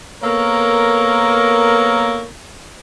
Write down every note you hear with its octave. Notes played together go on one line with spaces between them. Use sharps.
A#3 B3 A4 A#4 C#5